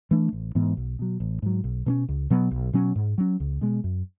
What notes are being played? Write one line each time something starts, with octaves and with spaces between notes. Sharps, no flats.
E3 A3 D4
A1
G#2 E3 B3
B1
B2 F#3
A1
G#2 F#3
B1
B2 A3 C#4
C#2
B2 F#3 B3
B1
B2 F#3 C#4
G#2
F#3 C#4
C#2
B2 G#3
F#2